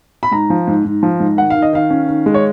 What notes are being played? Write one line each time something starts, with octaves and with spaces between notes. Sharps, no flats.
B5
G#2 A#5
F3
G#2
G#2
F3
G#2
D#3 F#5
D#3 F5
D#5
D#3 F5
C#4
D#3
G#3
C#5